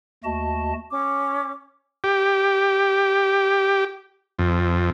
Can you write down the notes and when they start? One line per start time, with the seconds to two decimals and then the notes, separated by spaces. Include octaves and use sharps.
0.24 D#2 A3 F#4 D#5 A5
0.91 C#4 D6
2.04 G4
4.39 F2